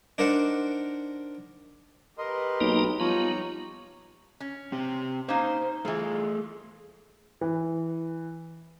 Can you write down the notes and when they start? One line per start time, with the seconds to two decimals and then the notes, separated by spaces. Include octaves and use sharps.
0.18 D4 D#4 A#4 C5 F#5
2.18 G4 A#4 B4 D#5 C6
2.61 B1 A#3 D#4
3.00 F3 G3 B3 D#4 C#5 A#5
4.40 C#4
4.72 C4 G4
5.28 A#3 C#4 D#4 C5
5.85 E3 A3 F4 G#4
7.41 E3